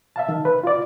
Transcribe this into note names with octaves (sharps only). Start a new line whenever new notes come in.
E5 F5 A5
D#3
B4
F4 D5